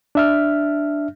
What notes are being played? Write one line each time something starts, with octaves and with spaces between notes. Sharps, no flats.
D4 E5 F6